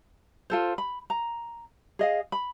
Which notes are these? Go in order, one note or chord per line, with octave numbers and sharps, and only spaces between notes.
F4 A4 C5
B5
A#5
G#4 D#5 F5
B5